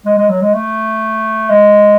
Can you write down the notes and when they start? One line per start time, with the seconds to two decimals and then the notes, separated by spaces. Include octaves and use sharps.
0.05 G#3
0.17 G#3
0.29 F#3
0.42 G#3
0.54 A3
1.50 G#3